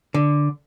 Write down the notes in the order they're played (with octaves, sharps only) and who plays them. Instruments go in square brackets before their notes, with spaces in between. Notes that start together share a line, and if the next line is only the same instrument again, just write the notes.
[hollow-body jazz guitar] D3